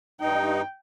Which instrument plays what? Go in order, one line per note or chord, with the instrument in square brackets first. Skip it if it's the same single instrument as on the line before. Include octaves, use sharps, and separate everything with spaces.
[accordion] G2 D#4 [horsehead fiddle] G5